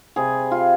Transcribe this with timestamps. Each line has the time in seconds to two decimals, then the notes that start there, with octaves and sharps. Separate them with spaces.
0.16 C3 G3 G#4
0.51 F4